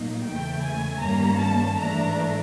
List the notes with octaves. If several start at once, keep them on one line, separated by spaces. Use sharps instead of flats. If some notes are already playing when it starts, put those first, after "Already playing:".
Already playing: A#2 F#3 A#3 D#4
E2 C#3 E3 A3 G5
G#5
G2 D#3 G3 A#3 C#4 A#5
A5
G#2 E3 A3 D4 A#5